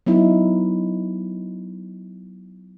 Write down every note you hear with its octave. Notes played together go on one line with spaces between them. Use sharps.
F#3 B3 D#4 E4